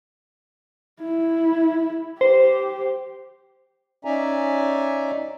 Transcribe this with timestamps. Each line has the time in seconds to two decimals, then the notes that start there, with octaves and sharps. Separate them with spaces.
1.01 E4
2.21 G4 C5
4.05 C#4 D#4 D5 E5 G#5 A#5